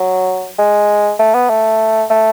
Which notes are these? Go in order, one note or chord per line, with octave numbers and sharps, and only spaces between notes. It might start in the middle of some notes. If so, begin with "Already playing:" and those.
Already playing: F#3
G#3
A3
B3
A3
A3